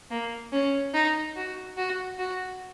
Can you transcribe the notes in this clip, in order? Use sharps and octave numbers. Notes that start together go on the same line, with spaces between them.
A#3
C#4
D#4
F#4
F#4
F#4